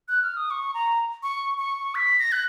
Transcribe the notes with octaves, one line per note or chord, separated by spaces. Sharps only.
F#6
F6
D#6
C#6
A#5
C#6
C#6
B6
A#6
F#6